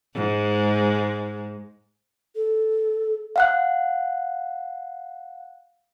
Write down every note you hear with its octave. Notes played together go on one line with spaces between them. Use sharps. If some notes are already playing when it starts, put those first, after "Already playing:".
G#2 G#3
A4
F5 F#5 F#6